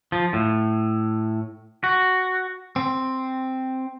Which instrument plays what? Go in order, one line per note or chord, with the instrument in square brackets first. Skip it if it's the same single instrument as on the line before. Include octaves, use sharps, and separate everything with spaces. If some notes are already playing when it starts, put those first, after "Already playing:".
[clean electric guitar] F3
A2
F#4
C4